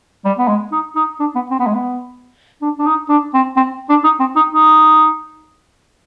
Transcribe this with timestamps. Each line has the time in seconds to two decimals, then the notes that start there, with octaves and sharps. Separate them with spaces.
0.25 G3
0.39 B3
0.48 G#3
0.72 D#4
0.96 D#4
1.20 D4
1.35 B3
1.51 C4
1.59 B3
1.67 G#3
1.75 B3
2.62 D4
2.79 D4
2.86 D#4
3.09 D4
3.34 C4
3.57 C4
3.89 D4
4.04 D#4
4.20 C4
4.36 D#4
4.52 D#4